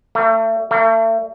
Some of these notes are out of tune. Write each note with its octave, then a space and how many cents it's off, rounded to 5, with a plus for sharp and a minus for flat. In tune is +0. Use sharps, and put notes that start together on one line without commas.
A3 +35
A3 +40